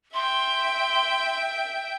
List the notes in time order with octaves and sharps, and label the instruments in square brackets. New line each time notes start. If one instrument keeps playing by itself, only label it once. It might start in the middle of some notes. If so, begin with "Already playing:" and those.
[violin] E5 G5 [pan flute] C6